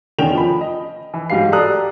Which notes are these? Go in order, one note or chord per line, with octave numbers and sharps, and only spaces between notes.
E2 D3 D#3 C#4 G5 F7
F3 B5
D#5
E3
G#2 F#3 G4 F5 C7
G4 A4 D5 A#5 D#6 F#6